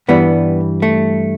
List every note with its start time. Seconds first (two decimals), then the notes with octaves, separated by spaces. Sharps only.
0.08 G2 E3 G3 B3
0.82 A3